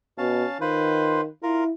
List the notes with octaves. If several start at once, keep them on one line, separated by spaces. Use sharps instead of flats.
B2 C#4 F5 A5
D#3 F4 B4 C5
E4 F4 A#4